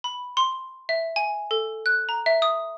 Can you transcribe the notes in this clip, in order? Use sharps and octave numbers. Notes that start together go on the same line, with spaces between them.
B5
C6
E5
G#5
A4
F#6
A#5
E5
D#6